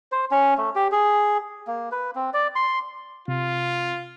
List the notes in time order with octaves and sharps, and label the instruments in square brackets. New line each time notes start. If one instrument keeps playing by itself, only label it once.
[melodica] C5
C#4
A3
G4
G#4
A#3
B4
C4
D5
C6
[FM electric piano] C3 [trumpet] F4